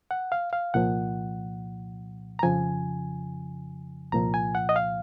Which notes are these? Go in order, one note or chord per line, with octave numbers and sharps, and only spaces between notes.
F#5
F5
F5
C2 A#2 F3 F#5
A#5
F2 C#3 F3 G#5
C2 A#2 F3 A#5
G#5
F#5
D#5
F5